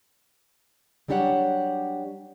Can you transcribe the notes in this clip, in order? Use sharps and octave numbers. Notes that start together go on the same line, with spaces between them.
F#3 G3 D4 G4 C#5 F#5